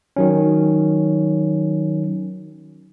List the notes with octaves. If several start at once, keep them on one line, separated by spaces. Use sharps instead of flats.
D#3 F#3 C#4